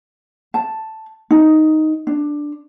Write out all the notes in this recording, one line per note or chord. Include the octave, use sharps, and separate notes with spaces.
A5
D#4
D4